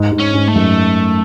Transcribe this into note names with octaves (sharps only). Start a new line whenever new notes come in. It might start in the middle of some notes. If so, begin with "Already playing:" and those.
Already playing: G#2
G#2
C#4
G#2
A3
F#2